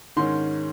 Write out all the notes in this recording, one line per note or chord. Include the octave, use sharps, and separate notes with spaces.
G#2 D#3 G#3 C#4 C6